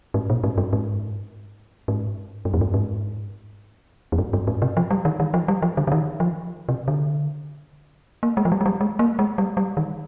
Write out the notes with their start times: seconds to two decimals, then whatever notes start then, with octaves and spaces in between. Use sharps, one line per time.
0.14 G#2
0.30 A#2
0.44 G#2
0.58 G2
0.73 G#2
1.88 G#2
2.45 G2
2.54 F2
2.61 G2
2.74 G#2
4.12 F2
4.18 G2
4.33 G2
4.47 G#2
4.62 C3
4.77 F3
4.91 G3
5.05 D#3
5.20 D#3
5.34 F3
5.48 G3
5.62 F3
5.77 D3
5.87 D3
5.92 D#3
6.20 F3
6.69 C3
6.88 D3
8.23 A#3
8.37 G#3
8.45 F3
8.52 G3
8.61 G#3
8.66 G3
8.81 G#3
8.99 A#3
9.19 G#3
9.38 G3
9.57 G3
9.77 D#3